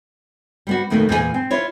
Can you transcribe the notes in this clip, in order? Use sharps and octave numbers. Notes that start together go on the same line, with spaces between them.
G3 B3 F#4
F2 B2 D#3 A3 A#3
E2 A#2 G#4 G#5
C4
E4 F4 C#5